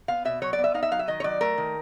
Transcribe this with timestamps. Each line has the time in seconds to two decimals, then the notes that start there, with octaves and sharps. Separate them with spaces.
0.08 B3 F5
0.25 B2 E5
0.42 F#3 C#5
0.53 D5
0.59 B3
0.64 E5
0.74 D#4 F5
0.83 E5
0.91 F#3 F5
0.99 E5
1.08 D#3 D#5
1.20 C#5
1.24 F#3 D5
1.41 A3 A#4
1.58 D#3